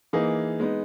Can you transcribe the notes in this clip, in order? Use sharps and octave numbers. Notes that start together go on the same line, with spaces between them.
E3 A#3 D#4 G#4
G#3 B3 D#4